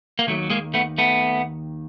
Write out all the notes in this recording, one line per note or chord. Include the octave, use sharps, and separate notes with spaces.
A#3
D#2 D#3 F#3 A3
G#3 A#3
A3 B3
A3 B3